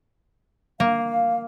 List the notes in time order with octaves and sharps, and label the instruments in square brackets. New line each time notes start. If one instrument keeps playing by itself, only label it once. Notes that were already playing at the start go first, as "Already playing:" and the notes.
[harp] A#3 [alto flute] F5